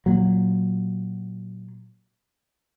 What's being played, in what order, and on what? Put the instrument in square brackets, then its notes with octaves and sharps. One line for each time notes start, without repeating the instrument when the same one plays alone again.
[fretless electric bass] A#2 F#3